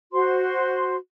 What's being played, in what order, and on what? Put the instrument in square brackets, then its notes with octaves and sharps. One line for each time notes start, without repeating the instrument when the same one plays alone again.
[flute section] F#4 C5 C6